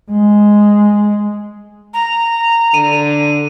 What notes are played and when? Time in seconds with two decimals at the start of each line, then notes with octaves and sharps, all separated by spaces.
0.11 G#3
1.94 A#5
2.74 D3 D#7